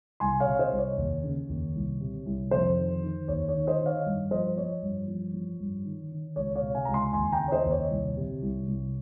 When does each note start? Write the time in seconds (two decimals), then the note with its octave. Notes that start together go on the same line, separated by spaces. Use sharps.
0.20 C2 G#5 C6
0.40 C#5 F5
0.47 C3
0.59 C5 D#5
0.72 C2
0.79 C#5
0.98 D#2
1.23 C#3
1.49 D#2
1.75 C2
2.01 C3
2.26 C2
2.51 F2 C5
2.78 D#3
3.02 D#3
3.28 D#2 C#5
3.49 C#5
3.54 D#3
3.67 C5 D#5
3.81 D#3
3.86 C#5 F5
4.06 G2
4.31 F3 C5 D#5
4.56 F3 C#5
4.82 G2
5.08 F3
5.34 F3
5.60 G2
5.85 D#3
6.11 D#3
6.36 C#2 C#5
6.55 C#5 F5
6.62 C3
6.75 F5 G#5
6.85 C#2 A#5
6.94 G#5 C6
7.13 D#2 G#5 C6
7.32 G5 A#5
7.40 C#3
7.48 C#5
7.51 C5 D#5
7.65 D#2
7.71 C#5
7.90 C2
8.17 C3
8.42 C2
8.68 C2